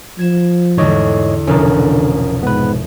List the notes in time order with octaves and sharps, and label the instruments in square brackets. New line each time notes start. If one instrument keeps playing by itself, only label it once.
[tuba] F3 [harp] G#6 E7
[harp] E2 D3 A3 [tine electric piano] G#2 C#5 D#5
[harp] F1 C2 B2 [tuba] D3 [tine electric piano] C#4 A#4
[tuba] G#2 [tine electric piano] B3 B4